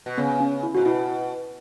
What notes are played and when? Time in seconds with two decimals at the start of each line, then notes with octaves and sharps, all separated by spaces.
0.06 B2
0.18 C#3 B3
0.40 C#4
0.63 E4
0.75 G#2 F#4
0.85 B2 E4